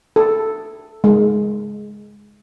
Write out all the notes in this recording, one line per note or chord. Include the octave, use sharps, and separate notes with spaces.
A4
G#3